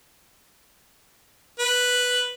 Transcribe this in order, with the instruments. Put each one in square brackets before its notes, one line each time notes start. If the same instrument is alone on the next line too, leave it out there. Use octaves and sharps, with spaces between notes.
[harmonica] B4